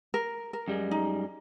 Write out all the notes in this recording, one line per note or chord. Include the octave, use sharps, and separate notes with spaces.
A#4
A#4
F#2 G3 G#3
D#4